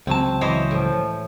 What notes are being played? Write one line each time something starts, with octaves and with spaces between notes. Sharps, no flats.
C#2 F#3 C4 A5
E3 C5 C#5 D#5
A2 F3